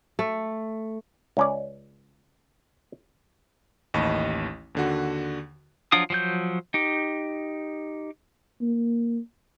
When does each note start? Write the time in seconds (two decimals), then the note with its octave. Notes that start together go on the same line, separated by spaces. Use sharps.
0.19 A3
1.37 C#2 C#4 D5
3.94 A1 D#2 D#5 B5 C#6
4.75 D#2 D3 F#4
5.92 F3 F#3 D4 F4 D#6
6.10 F3 F#3 G6
6.74 D#4 G4
8.62 A#3